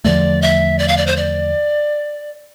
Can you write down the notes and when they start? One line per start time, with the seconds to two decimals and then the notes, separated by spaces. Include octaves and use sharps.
0.04 E2 D3 F3 A3 D5
0.42 E5
0.79 D5
0.88 F5
0.97 D5
1.07 C5
1.17 D5